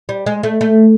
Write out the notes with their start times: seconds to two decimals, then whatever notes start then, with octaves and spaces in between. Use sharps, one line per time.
0.09 G3
0.26 G#3
0.43 A3
0.61 A3